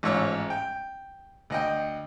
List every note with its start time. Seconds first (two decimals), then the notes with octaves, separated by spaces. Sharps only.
0.03 A1 G#2 F3 C#5 E6
0.50 G5
1.50 D2 D#5 G5